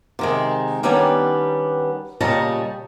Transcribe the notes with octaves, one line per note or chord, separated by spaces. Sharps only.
C3 D#3 G#3
D#3 G3 B3 C#4 D4 B4
A#2 C#3 G3 C#5 D#5 A5